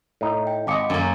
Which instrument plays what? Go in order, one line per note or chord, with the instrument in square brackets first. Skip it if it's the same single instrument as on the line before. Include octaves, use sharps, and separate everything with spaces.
[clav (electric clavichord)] A2 D#4
[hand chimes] G5
[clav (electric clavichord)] G#1 D#5 [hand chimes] F5 D6 C#7
[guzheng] F#2 A#3